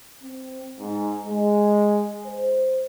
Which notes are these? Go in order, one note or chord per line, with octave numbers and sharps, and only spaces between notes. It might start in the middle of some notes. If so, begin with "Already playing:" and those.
C4
G#2
G#3
C5